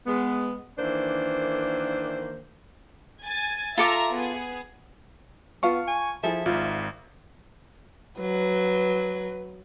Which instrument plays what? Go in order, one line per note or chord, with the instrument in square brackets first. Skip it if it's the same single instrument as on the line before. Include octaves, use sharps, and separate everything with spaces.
[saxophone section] G#3 B3
D#3 E3 A#3 D4 C5
[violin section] G#5 A6
[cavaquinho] F4 A4 D6 [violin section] E5 A#5
[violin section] B3 G#4
[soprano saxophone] B3 [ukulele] F4 F5 A5 [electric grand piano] C#6
[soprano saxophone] G#5
[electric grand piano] F3 [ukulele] E4 G#4 A4 [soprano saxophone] E5
[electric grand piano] G#1 G#2 [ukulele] F4
[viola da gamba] F#3 [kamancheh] B4